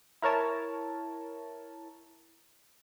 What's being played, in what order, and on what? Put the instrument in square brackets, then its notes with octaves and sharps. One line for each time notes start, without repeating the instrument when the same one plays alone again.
[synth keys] E4 A#4 C#5 A5